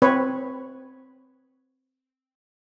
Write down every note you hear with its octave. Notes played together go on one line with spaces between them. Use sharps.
C4 B4 C#5